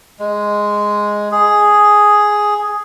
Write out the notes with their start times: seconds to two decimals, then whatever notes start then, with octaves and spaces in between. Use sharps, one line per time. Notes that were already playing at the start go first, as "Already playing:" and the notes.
0.19 G#3
1.31 G#4